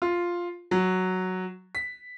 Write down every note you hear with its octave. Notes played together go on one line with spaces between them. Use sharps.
F4
F#3
B6